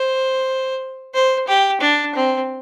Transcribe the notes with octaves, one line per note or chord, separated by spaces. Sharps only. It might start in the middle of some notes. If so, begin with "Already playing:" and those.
Already playing: C5
C5
G4
D4
C4